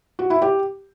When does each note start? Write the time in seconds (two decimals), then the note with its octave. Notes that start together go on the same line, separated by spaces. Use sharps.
0.19 F#4
0.30 E4
0.42 G4